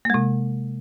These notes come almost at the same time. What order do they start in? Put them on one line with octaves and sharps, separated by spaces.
A#3 G#3 C3